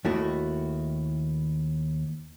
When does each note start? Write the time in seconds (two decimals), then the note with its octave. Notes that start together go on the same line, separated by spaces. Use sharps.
0.05 D#2 D#3 A3 E4 F#4